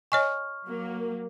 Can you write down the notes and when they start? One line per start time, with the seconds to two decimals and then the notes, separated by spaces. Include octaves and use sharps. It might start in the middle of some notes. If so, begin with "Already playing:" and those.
0.12 C#5 D#5 G#5 C#6 F6
0.66 F#3 A#3